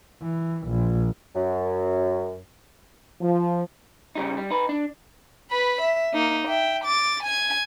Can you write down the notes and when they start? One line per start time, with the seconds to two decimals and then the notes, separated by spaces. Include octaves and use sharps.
0.22 E3
0.68 A#1
1.35 F#2
3.20 F3
4.15 C#3 G3 D#4
4.37 G3
4.50 D#4 B4
4.69 D4
5.51 B4 B5
5.81 E5
6.14 A#3 D#4
6.47 E5 G5
6.84 D6 A6
7.23 G#5 G#6